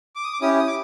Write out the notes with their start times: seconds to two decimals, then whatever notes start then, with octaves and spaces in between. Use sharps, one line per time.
0.16 D6
0.24 D#6
0.33 D6
0.41 C#4 E4 G4 D#6
0.59 D#6
0.67 D6